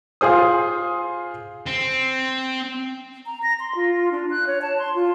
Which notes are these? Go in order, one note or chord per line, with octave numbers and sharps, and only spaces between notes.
F4 G#4 C5 D#6
C4
A#5
A#6
C6
F4
D4
F#6
C#5
A5
C6
F4